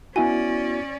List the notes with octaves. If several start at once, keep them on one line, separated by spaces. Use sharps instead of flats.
B3 C#4 E4 F#4 D5 G#5